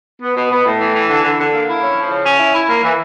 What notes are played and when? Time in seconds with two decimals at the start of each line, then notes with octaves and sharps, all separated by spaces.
0.22 B3
0.36 B2
0.51 B3
0.65 A2
0.80 E3
0.94 E3
1.08 D3
1.24 D3
1.38 D3
1.53 A#3
1.68 E4
1.82 C#4
1.96 F3
2.10 C#3
2.25 C#4
2.39 E4
2.54 E4
2.68 A#3
2.83 E3